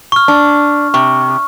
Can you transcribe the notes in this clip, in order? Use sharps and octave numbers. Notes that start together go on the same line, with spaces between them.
C#6 F6
D4
C3 C#6